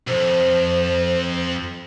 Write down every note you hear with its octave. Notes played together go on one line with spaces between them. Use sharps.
C2 F2 C5